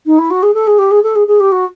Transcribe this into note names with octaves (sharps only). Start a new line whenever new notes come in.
D#4
E4
F#4
G#4
A4
G#4
G4
G#4
A4
G#4
G#4
G4
F#4